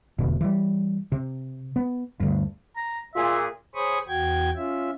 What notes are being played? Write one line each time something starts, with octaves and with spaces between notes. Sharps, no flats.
E1 D2 B2
E3 G3
C3
B3
D2 G2
A#5
A#2 F4 G#4 E5
G#4 C5 C#5 B5 C#6 D#6
E2 F#4 G5 G#6
C#4 F4 E5